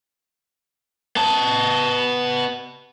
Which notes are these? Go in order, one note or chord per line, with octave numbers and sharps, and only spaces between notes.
B3 A5